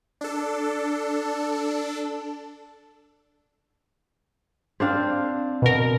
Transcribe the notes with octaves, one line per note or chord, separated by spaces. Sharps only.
D4 A4
C4 D4 F5
B2 A#4